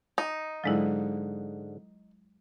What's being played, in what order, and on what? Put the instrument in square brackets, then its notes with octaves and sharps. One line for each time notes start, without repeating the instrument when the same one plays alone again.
[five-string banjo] D#4
[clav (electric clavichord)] G#2 D3 F5 [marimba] F#3 G#3 E4